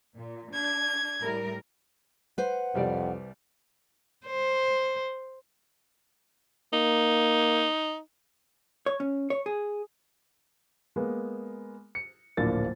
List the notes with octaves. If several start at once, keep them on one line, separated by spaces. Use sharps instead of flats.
A#2
D4 G#6
A2 G3 A#4
B4 C5 F#5
C2 F2 G3 D5
C5
A#3 D#4
C#5
C#4
C#5
G#4
G#3 A#3 B3
C#7
D1 A#1 A#3 D4 A6